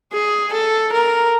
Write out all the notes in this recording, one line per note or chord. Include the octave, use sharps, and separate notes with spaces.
G#4
A4
A#4